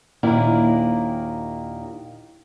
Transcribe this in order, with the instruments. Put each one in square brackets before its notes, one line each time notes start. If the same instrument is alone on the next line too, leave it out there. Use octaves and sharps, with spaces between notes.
[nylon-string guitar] D#2 A#2 D#3 D4 E4